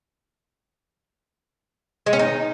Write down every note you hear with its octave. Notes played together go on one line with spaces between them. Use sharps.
G#3
C#4
D#4